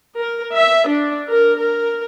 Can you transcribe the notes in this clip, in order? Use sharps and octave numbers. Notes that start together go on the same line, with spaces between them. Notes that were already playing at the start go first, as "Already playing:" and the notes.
A#4
E5
D4
A#4
A#4